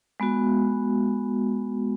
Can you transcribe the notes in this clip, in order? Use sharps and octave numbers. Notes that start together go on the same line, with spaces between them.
G#3 B3 F#4